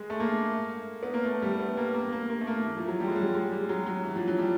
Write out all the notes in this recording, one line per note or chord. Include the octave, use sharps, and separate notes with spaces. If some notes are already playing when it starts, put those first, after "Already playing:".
Already playing: G#3
A3
A#3
B3
A#3
A3
G3
B3
A#3
A#3
A#3
A#3
A3
A#3
E3
F3
F#3
G3
G#3
G3
G#3
G3
F#3
F#3
E3
F3
F#3
G3